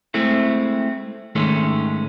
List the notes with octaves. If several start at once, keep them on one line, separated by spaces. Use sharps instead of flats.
G#3 A3 C4 E4
G#2 D#3 G#3 A3 C#4